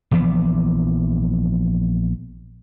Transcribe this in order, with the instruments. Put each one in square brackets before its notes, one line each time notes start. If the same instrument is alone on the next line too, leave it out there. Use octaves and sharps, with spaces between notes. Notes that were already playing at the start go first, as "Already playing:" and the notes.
[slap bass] A#1 E3 F3 B3